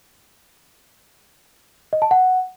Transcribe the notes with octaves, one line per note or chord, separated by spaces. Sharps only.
D#5
A5
F#5